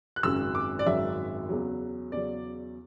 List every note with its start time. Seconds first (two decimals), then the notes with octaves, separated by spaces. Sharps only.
0.16 F#6
0.23 G#1 F#2 C#3 F#3 E6
0.55 D6
0.79 D5
0.86 G#1 F#2 C#3 F#3 E5
1.49 E2 C#3 F#3
2.12 E2 C#3 F#3 D5